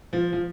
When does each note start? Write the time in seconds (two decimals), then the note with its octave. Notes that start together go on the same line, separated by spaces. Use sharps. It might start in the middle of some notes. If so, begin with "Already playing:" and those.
0.13 F3
0.33 F3